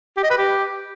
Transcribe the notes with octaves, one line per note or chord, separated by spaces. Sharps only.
G4
D#5
B4
G4